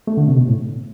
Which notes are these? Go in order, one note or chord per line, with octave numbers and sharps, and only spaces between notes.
A3
D3
C3
B2
A2